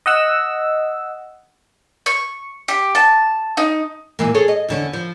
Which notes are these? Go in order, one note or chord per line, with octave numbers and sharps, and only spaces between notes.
D#5 F#5 E6
C#6
G4
A5
D#4
A#2 E3 A#3
G#4 A4 C#5
D#5
E2 D3 C#4
F3